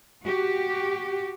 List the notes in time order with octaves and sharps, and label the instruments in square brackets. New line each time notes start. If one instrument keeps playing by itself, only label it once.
[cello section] F#4 G4